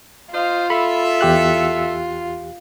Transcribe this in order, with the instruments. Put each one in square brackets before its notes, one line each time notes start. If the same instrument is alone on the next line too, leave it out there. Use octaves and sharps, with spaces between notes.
[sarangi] F4 [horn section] C5 D#5 F5
[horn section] A4 E5 [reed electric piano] B5
[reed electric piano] E2 G4 F#6